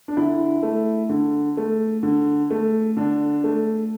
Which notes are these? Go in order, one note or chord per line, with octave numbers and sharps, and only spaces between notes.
D4
D3 E4
A3
D3
A3
D3
A3
D3 D4
A3